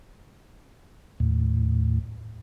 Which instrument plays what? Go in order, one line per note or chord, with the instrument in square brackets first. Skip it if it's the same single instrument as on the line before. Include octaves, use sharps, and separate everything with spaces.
[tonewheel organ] D#2 A2